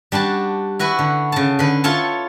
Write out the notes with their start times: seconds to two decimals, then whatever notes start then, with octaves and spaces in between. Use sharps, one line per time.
0.12 G3 D4 F#4 A5
0.79 E4 F#4 B4
0.99 D3
1.32 C#3 A5
1.59 D3 B4
1.84 E4 F4 A4 C#5 A5